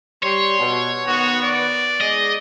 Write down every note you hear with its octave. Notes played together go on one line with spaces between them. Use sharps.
G3 C#5 C6
B2
D#3 B3 F#4
D5
G#3 D#4 G#4 D#5